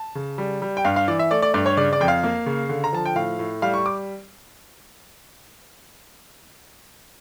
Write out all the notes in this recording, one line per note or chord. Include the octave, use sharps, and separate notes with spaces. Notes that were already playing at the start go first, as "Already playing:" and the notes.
Already playing: A5
C#3
G3
G3
G5
G2 F5
F5
E3 D5
E5
A3 D5
D5
G2 D5
C#5
C#3 D5
D5
F2 G5
F5
A#3
C#3
D3
A#5
F3 A5
G5
A2 F5
A2
G3 F5
C#6
D6